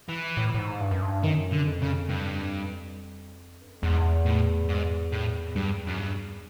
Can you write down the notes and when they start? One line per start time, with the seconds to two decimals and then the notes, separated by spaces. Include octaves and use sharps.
0.09 E3
0.37 A2
0.54 A2
0.58 G#2
0.81 G2
0.91 F#2
1.02 G2
1.23 F#2 D#3
1.52 D3
1.67 F2
1.82 C#3
2.09 G2
3.61 G2
3.68 F#2
3.76 F2
3.83 E2 G#2
4.26 A2
4.69 G#2
5.12 A2
5.56 G2
5.87 F#2
5.98 G2